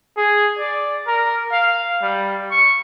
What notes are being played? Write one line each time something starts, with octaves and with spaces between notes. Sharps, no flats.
G#4
D5
A#4
F5
G3
C#6